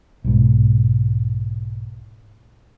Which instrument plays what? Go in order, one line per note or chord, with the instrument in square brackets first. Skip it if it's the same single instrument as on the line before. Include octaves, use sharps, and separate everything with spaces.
[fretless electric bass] B1 G#2